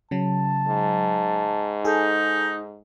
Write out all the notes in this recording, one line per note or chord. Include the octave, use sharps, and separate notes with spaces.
C#3 F#3 A5
G#2
D#4 G#4 A4